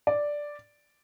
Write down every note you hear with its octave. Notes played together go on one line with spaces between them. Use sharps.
D5